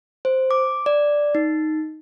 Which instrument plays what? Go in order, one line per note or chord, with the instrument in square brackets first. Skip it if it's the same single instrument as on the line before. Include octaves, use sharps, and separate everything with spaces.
[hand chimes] C5
D6
D5
D#4